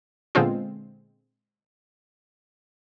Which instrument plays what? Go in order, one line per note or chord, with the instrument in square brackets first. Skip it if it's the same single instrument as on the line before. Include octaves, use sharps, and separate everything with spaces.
[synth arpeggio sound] A#2 D3 G#3 B3 C4 F4